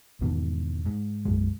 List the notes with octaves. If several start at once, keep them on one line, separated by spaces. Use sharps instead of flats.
E2 G#2 B2 D#3
G#2
B1 F#2 G#3